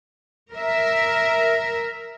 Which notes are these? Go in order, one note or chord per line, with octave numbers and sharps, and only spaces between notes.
A#4 E5